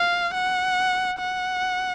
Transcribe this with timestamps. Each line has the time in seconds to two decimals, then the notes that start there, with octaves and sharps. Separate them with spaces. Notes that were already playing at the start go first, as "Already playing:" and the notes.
Already playing: F5
0.34 F#5
1.19 F#5